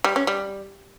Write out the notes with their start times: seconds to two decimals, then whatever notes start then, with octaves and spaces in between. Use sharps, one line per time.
0.04 G3
0.16 C#4
0.27 G3